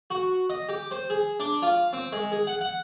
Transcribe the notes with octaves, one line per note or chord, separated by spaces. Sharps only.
F#4
D#5
G4
C5
G#4
D4
F4
C4
G#3
G#4
F#5
F#5